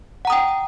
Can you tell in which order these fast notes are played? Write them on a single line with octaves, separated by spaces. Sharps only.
F#5 A#5 D#6 G5